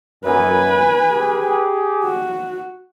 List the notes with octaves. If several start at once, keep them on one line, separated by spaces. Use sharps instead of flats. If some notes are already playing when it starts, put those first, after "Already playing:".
F#2 B4 G#5
G4 G#4
F#4